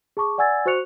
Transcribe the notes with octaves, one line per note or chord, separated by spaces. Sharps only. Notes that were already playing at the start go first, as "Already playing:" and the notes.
G#4 A5 C#6 D6
D5 F#5 G#5 E6 G#6 A6
F#4 C5 C#6 F#6 C#7 F7